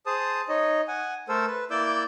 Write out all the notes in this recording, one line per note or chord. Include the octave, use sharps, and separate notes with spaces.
G#4 C5 A5 D#6
D#4 C#5 D#5
F#5 G#5
A3 A4 A#4 C5 E6
B4
A#3 E4 D5 D6 E6 G6